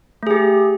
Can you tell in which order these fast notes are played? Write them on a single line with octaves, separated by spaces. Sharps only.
A3 G#4 G4